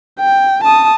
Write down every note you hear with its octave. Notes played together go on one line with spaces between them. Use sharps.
G5
A5 D#6